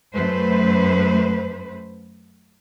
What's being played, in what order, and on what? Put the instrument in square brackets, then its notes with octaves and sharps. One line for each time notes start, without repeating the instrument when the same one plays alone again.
[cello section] F#2 A3 B4 C5